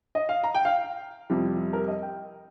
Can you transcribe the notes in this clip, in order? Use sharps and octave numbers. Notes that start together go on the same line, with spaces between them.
D#5
F5
A#5
G5
F5
F2 C3 G3
A#4
D#5
G5